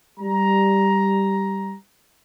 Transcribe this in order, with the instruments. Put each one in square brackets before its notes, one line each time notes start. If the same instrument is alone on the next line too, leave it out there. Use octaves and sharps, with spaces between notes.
[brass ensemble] G3 A#5